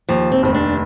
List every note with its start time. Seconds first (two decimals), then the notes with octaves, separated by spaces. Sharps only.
0.09 D#2 F3
0.32 C4
0.43 F1 C4
0.55 D4